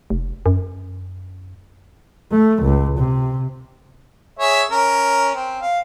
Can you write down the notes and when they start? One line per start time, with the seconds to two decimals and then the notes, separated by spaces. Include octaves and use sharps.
0.10 F1
0.46 F#2
2.32 A3
2.63 C#2
2.98 C3
4.39 G#4 C#5 E5
4.71 C#4 A#4
5.34 C4
5.61 F5